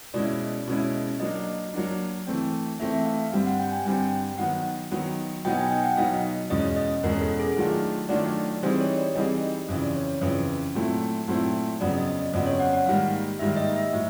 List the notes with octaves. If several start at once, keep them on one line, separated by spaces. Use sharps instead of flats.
B2 G#3 C#4 E4 D5
B2 G#3 C#4 E4
F#3 A#3 D4 D#5
F#3 A#3 D4
E3 A3 C4
E3 A3 C4 E5
E5
F5
F5
G2 D3 G3 C4 F5
F#5
G5
G#5
G2 D3 G3 C4 G5
D#3 F#3 B3 F#5
D#3 F#3 B3
B2 F#3 B3 D#4 G5
G#5
G5
F#5
B2 F#3 B3 D#4 F5
E2 B2 G#3 C#4 D#5
D#5
E2 B2 G#3 C#4 A#4
A4
G#4
D#3 F#3 A3 D4 F4
D#3 F#3 A3 D4 F4 D5
E3 G3 C4 D#4 G#4 C5
C#5
D5
E3 G3 C4 D#4 G#4 D#5
F2 C#3 E3
D5
C#5
F2 C#3 E3 B4
A#2 F#3 A3 C4 E4
A#2 F#3 A3 C4 E4
F2 C#3 F#3 B3 D5
D#5
D#5
F2 C#3 F#3 B3 D5
C#5
F#5
F#5
G#2 D#3 G3 A#3 F5
G#2 D#3 G3 A#3 E5
D#5
E5
A2 F#3